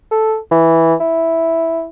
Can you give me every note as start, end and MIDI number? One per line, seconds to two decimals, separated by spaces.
0.11 0.37 69
0.51 0.94 52
1.00 1.87 64